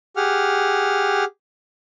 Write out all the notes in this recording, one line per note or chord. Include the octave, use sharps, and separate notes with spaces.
G4 G#4 F#5 F6